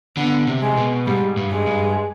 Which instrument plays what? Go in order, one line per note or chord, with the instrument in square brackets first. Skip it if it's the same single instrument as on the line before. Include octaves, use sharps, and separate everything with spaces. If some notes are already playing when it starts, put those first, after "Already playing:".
[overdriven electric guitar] D3 [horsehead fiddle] B3
[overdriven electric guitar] C3
[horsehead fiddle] G#3
[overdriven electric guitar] B2
[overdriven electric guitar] G#2 [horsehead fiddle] G3
[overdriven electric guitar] G2
[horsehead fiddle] G#3
[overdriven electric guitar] G2